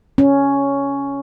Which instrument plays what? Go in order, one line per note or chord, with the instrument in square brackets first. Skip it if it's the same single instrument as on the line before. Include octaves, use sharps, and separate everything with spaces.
[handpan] C#4